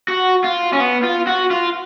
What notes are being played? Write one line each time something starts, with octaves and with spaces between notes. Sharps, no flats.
F#4
F4
C#4
B3
F4
F#4
F4